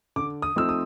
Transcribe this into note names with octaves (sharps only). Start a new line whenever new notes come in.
D3 D6
D#6
F3 A3 C4 D#4 E6
D#6